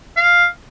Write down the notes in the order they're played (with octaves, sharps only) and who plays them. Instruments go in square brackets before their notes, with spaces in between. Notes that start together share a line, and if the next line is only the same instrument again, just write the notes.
[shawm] F5